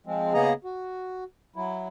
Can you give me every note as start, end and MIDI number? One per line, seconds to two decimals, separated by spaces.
0.06 0.33 53
0.06 0.33 56
0.06 0.33 60
0.34 0.53 49
0.34 0.53 58
0.34 0.53 59
0.34 0.53 68
0.34 0.53 75
0.34 0.53 82
0.64 1.24 66
1.56 1.88 54
1.56 1.88 64